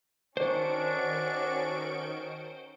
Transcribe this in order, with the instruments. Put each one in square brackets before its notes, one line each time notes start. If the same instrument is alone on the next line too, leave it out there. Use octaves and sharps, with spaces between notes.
[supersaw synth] D#3 C#6 D7 [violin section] C#4 F#4 A4 [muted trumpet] D4 [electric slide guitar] C5